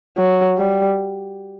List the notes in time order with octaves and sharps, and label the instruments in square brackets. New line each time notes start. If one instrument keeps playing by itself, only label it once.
[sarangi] F#3
G3